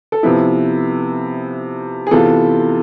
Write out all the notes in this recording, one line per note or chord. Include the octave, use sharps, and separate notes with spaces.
A4
C3 F3 B3 E4 B4
G#4
C3 E3 B3 F4 A4